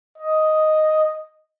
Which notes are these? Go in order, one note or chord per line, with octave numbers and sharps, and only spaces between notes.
D#5